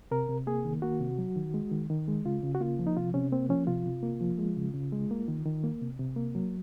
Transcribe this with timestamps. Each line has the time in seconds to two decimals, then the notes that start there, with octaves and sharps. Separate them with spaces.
0.11 C3 A#4
0.29 C3
0.47 A#3 G#4
0.65 D#3
0.82 A#3 F#4
1.00 C3
1.18 F#3
1.36 D#3
1.54 G#3
1.71 D#3
1.90 D#3
2.08 G#3
2.25 C#3 F4
2.43 C#3
2.55 F#4
2.60 A#3 F4
2.79 F3
2.87 D#4
2.96 C3 F4
3.14 C3 C#4
3.32 A#3 C4
3.49 F3 C#4
3.67 C3 F4
3.86 C3
4.03 A#3
4.21 F3
4.39 G#3
4.56 C#3
4.74 C#3
4.92 G#3
5.11 A#3
5.28 D#3
5.45 D#3
5.64 A#3
5.81 C3
5.99 C3
6.16 A#3
6.35 F#3